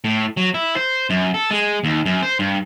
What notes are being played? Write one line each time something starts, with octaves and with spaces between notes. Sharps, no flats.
A2
F#3
E4
C5
F#2
A4
G#3
D#2
F#2
C5
G2